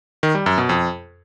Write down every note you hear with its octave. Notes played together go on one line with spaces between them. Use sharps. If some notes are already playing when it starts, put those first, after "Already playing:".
D#3
G3
F#2
B2
F2